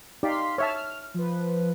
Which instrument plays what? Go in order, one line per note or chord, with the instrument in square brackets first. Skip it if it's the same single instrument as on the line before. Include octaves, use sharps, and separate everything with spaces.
[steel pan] D#4 G4 D5 [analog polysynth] F5 C6 B6
[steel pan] C#5 E5 A5 [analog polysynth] F6
[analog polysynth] F3 B4